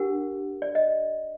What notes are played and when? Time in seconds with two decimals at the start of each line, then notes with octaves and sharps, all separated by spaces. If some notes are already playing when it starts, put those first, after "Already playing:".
Already playing: D4 G4 A#4 F#5
0.62 D5
0.75 D#5